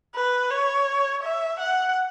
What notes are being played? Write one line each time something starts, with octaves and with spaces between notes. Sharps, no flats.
B4
C#5
E5
F#5